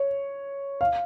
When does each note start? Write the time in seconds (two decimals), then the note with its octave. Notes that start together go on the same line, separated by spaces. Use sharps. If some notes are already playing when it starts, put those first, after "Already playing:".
Already playing: C#5
0.81 F5